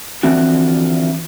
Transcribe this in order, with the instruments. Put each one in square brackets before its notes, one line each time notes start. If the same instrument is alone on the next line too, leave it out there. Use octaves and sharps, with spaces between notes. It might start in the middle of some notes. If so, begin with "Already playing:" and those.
[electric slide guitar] D3 E3 F3 C4 F#4